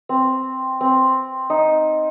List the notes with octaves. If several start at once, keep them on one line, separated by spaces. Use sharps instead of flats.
C4
C4
D#4